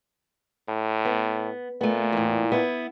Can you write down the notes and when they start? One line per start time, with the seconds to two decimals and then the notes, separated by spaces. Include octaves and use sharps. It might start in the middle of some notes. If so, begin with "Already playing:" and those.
0.68 A2
1.05 B3
1.81 A#2 A3 B3
2.13 E2 A2
2.52 B3 E4